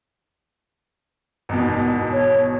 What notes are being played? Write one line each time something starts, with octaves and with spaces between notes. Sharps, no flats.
G#1 E2 B2
C#5